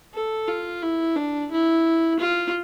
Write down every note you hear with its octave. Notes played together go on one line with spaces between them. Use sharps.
A4
F4
E4
D4
E4
F4